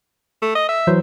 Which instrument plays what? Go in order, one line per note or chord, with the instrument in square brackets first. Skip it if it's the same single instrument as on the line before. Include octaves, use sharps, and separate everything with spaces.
[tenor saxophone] A3
D#5
E5
[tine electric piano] E3 F#3 C5